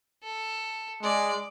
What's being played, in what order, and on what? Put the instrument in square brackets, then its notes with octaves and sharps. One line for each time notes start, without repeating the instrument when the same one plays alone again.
[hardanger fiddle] A4
[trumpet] G#3 [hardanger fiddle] D5